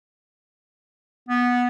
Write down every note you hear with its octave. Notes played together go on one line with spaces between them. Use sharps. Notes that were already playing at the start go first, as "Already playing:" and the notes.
B3